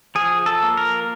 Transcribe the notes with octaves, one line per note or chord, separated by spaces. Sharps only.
F3 G#4
A4
A#3
A#4